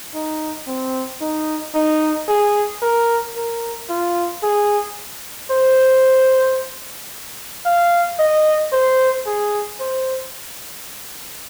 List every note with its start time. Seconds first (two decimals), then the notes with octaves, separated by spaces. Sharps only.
0.14 D#4
0.68 C4
1.21 D#4
1.75 D#4
2.28 G#4
2.82 A#4
3.36 A#4
3.89 F4
4.43 G#4
5.51 C5
7.66 F5
8.19 D#5
8.72 C5
9.26 G#4
9.80 C5